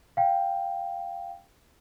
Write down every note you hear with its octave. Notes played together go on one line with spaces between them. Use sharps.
F5 G5